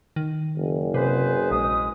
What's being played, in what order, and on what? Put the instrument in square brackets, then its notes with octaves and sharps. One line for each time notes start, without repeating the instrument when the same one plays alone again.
[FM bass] D#3
[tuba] F#1
[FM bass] C3 [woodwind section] G#4 B4 C5
[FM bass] A#1 [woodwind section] G#3 D#6